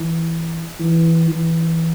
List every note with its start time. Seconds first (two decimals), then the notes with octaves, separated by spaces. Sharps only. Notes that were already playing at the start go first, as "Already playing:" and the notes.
Already playing: E3
0.79 E3
1.31 E3